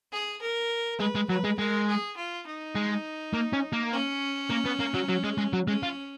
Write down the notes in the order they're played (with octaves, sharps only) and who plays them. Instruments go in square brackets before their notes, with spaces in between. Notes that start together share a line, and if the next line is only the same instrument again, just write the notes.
[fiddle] G#4
A#4
[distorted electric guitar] G#3 [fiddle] B4
[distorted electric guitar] G#3
[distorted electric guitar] F#3 [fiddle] B4
[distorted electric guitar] G#3
[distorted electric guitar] G#3 [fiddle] A#4
[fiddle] G#4
F4
D#4
[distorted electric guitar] G#3
A#3
C#4
A#3
[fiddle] C#4
[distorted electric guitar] A#3
B3
A#3
F#3
F#3
G#3
G#3
F#3
[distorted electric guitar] G#3 [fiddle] C#4
[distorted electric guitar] F4